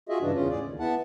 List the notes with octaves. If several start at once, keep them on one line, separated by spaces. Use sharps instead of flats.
F4 F#4 G#4 D#5 E5
G2 C#3 E3 D4
E2 C#3 C#4 F4
A2 G#4 D5
D#2
B3 E4 F#5 A5